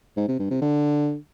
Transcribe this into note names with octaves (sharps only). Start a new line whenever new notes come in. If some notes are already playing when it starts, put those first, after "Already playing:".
G#2
C3
G2
C3
D3